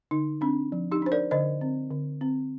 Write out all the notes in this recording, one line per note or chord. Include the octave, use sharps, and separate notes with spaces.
D3 D#4
C4 D4
F3
D#4 G4
D4 C5
A#4 D5
D3 C5 D#5
C4
D3
C4